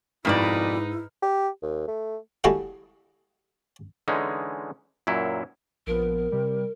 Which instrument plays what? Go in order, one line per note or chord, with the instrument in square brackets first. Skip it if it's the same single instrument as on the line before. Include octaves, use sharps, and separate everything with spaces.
[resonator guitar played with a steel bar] F2 B2 D5 [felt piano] G#2 F6 [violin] D#4 B4 [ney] E4
[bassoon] G4
D#2
A3
[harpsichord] G3 A#3 E4 F#4 G#4 A4
[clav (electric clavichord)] D3 E3 G#3 C#4 D#4
F#2 A#2 F#3 E4
[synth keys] A#1 F3 B3 [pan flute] A#4
[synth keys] C3 G3